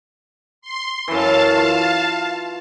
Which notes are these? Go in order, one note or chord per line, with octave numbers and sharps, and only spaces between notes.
C6
F#2 E3 F5 A5
F4